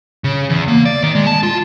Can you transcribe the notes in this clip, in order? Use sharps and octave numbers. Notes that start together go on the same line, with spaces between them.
C#3
E2
A#3
D5
D#3
G#3
A5
F4